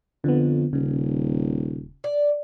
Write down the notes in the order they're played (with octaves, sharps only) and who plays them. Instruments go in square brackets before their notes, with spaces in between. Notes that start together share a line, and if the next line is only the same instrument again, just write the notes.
[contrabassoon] F2 [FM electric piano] D3 B3
[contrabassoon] D#1 [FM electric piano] C#3
[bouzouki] D5